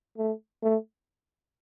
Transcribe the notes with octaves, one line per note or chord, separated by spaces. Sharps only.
A3
A3